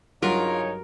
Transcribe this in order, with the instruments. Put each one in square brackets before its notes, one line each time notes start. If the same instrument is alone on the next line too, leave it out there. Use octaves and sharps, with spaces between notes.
[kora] G2 F#3 F#5 [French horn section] C#3 D#4 C#5 [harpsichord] F4 [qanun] A#4